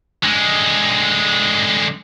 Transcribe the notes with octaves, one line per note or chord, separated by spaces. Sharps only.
D3 G#3